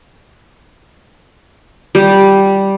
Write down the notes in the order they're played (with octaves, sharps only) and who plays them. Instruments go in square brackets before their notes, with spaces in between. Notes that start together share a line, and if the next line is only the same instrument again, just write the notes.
[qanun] G3